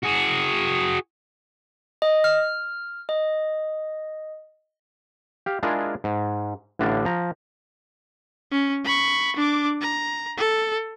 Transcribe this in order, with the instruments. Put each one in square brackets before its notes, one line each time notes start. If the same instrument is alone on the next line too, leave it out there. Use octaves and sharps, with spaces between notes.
[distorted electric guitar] F#4 G#4
[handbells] D#5
F6
D#5
[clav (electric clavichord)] G4 F5
G#3 D4 E4 F4 G#4 A#4
G#2
A1 A2 D3 D4 D5 F5
F3 A#5
[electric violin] C#4
B5 C#6
D4 D6
A#5
A4